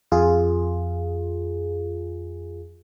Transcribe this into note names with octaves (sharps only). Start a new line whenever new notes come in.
F2 F4 G#4